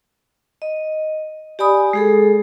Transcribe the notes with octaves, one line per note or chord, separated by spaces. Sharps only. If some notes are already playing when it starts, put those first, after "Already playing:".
D#5
G4 D5 G#5 B5 D#6
G#3 G#4 A4